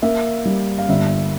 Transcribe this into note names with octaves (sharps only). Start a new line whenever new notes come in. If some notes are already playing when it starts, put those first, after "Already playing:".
A#3 E5
G3
F5
G1 E5